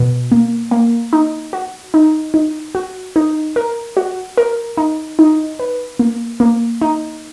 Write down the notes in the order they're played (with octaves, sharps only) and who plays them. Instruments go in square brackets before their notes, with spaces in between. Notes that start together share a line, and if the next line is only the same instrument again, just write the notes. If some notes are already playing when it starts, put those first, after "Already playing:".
Already playing: [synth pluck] B2
A#3
A#3
D#4
F#4
D#4
D#4
F#4
D#4
A#4
F#4
A#4
D#4
D#4
B4
A#3
A#3
D#4